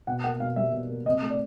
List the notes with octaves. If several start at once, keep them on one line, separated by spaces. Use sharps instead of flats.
B2 F#5
A#3 F#5
B2 F5
G3 E5
B2
A#3
C3 D#5
A3
D5